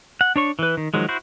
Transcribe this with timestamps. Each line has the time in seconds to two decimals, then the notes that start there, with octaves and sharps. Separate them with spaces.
0.21 F#5
0.36 D4 C#5 C#6
0.59 E3 B4
0.77 D#3
0.94 D#3 F3 F#3 G#3
1.09 E4 F#4 C5